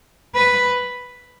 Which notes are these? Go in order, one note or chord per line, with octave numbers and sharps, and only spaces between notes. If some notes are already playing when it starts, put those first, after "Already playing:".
B4